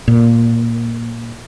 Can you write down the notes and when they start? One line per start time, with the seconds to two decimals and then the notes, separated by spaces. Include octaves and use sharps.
0.08 A#2